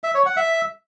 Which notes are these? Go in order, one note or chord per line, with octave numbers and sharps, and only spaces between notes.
E5
C#5
F#5
E5